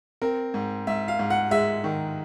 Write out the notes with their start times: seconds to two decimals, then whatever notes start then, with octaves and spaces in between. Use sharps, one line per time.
0.22 C4 A#4
0.54 G#2
0.87 G#2 E5
1.08 F5
1.19 G#2
1.30 F#5
1.51 G#3 E5
1.84 D#3